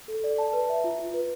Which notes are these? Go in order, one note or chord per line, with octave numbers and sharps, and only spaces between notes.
A4
D5
A5
B4
E5
F4
F4
B4